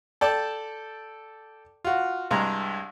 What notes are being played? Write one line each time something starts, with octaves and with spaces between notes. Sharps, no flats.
A4 D5 G5 A5
F4 F#4
C2 G2 G#3 A#5